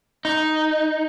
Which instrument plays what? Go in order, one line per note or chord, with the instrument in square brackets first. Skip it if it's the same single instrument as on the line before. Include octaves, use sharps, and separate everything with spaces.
[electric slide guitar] D#4